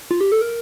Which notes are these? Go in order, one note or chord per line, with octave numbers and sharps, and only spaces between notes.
F4
G4
A4
A#4